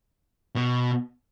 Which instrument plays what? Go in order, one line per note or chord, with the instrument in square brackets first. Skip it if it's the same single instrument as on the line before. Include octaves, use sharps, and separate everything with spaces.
[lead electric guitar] B2